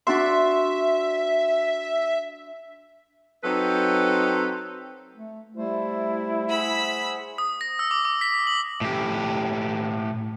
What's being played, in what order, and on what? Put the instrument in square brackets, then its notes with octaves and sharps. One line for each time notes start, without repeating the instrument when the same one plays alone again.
[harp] D4 F#4 C6 [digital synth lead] E5
[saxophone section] F#3 C4 D#4 A4 B4 C5
[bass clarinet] A3
[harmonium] G3 C5 [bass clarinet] A3 [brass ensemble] E4
[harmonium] G#4 C5 F#5 [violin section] B5 E6 B6
[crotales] D#6
A#6
E6
D6
D6
B6
F#7
[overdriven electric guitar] A2 G4